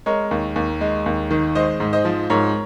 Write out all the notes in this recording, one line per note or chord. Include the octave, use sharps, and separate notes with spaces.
G#3 A#4 C#5
D#2
D#2
G#3
D#2
D#3
G#3 C5 D#5
G#2
C5 D#5
F3
G#2 A#4 C#5